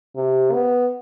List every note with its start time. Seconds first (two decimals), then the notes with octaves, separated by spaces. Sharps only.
0.16 C3
0.53 B3